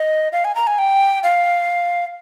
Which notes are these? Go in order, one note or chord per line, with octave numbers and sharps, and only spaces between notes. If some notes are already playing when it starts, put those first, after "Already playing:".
Already playing: D#5
F5
G#5
A#5
G#5
G5
F5